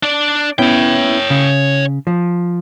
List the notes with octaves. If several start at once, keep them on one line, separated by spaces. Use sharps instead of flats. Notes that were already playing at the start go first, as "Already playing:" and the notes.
D4 D5
B3 C#4 E4 C#5 G5
C#3
F3